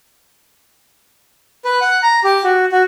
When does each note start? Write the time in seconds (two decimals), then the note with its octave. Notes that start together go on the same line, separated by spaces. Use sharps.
1.65 B4
1.81 F#5
2.03 A#5
2.24 G4
2.44 F#4
2.72 F#4